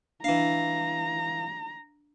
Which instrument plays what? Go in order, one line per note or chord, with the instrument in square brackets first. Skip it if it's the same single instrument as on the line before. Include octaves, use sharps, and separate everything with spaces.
[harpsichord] E3 F5 [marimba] D4 [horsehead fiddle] A#5